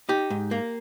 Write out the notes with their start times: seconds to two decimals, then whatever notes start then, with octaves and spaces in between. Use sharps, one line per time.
0.09 D#4 G4
0.30 G#2
0.51 A#3